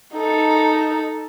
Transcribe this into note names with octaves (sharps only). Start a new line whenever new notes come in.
D#4 A4